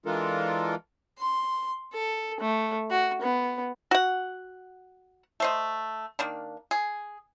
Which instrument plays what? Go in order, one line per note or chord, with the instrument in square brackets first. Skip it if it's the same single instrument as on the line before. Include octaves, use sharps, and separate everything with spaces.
[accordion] E3 G#3 D4 F4 A4 A#4
[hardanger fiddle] C6
A4
A3
F#4
B3
[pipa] F#4 F#5
A3 C5 D#5
D#3 A#3 D4
G#4